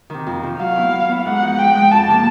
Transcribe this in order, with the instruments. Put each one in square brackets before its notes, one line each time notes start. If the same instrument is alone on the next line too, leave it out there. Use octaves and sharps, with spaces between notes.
[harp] C3 D#3
F2
C3 D#3
[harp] F#3 [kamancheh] F5
[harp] B3 E4
F#3
B3 E4
[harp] G#2 [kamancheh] F#5
[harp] F3 G#3
[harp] G#2 [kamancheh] G5
[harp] F3 G#3
[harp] F2 [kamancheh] A5
[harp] C3 F3 A#3